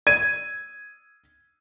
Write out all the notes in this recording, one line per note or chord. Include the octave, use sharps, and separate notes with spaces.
G#6 D#7